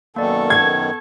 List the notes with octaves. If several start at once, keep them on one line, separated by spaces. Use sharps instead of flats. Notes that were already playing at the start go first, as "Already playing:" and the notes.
F#2 B2 D#3 A#3 A4 D5 C#6
B3 G#6